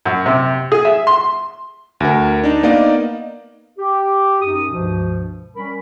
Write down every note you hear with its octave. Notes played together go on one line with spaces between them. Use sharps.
F#2
C3
G#4
E5
C6
D2 A#4
D4 D#4
A#3 B3 D#4 D5 D#5 F5
G4
F#2 D#4 D#6
C#2 G2 B2 F3
G3 C#4 A#4 B5